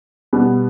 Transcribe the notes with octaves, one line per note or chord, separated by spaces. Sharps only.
B2 G3 B3